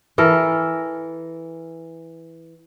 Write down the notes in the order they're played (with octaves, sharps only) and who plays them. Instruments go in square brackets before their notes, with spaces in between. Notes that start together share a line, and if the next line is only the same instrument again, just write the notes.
[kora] E3 A4 A#4